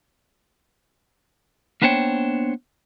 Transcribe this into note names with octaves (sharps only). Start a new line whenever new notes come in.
A#3 B3 D4 C5 C#5 G5